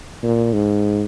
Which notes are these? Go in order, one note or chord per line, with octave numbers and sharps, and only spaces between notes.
A#2
G#2